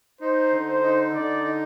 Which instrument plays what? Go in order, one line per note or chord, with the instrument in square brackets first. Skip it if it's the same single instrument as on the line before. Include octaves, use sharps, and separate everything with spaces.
[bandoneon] D#4 [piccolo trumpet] C5
[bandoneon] D3
[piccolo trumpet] C5
[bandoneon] D#4
[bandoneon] D3 [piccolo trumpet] D5
[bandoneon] D#4